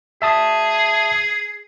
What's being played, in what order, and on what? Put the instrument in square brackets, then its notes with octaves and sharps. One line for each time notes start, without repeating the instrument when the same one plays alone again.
[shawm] G#4 [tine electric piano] E5 A5 D#6